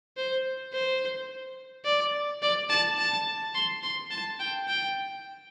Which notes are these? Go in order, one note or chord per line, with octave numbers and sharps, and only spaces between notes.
C5
C5
D5
D5
A5
A5
C6
C6
A5
G5
G5